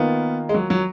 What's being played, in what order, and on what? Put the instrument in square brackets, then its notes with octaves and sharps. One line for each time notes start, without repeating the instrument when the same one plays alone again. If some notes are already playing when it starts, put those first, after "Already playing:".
Already playing: [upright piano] D#3 A#3 F4 [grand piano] B3
[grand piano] G#3
F#3
F#3